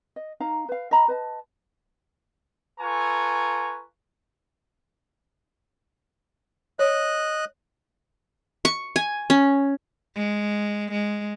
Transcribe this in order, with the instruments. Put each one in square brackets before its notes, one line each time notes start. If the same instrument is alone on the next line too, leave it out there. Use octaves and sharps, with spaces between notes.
[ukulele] D#5
D#4 F5 A#5
B4 F5
D#5 F5 A#5 B5
B4 D#5 A5
[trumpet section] F4 A4 B4 G#5 A#5 C#6
[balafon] C#5 [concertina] D#5 F#6
[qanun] C#6
G#5
C#4
[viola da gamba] G#3
G#3